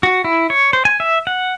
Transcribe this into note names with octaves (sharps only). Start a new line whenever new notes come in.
F#4
E4
C#5
C5
G#5
E5
F#5